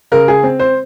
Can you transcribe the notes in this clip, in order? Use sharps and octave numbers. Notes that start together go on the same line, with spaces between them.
C#3 A#4
G#4
C4
C5